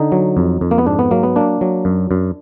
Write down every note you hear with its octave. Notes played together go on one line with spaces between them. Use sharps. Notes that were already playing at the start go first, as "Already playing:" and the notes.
Already playing: D3 D#4
F#3
F2
F2
A#3
B3
G#2 D4
B3
F#3 A#3
B3
A#3 D4
F#3
F#2
F#2